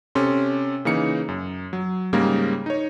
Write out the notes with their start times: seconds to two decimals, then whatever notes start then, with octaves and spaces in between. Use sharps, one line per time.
0.15 C3 C#4 A4 C6
0.85 C#3 E3 A#3 D#4 C#7
1.28 F#2
1.73 F#3
2.13 G#2 C#3 G3 A#3 A#4 G#6
2.66 D#4 C#5